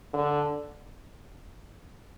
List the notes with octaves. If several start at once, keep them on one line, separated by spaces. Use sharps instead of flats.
D3